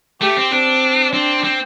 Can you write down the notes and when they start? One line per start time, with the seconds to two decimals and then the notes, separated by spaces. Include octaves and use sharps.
0.21 A3 G4
0.37 C4
0.52 C4 D4
1.13 C4 D4
1.44 C4